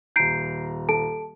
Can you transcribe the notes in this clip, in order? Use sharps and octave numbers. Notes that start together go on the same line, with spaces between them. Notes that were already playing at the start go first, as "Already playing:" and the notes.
D#1 A#5 G6 C7 D7
A4 A5 D7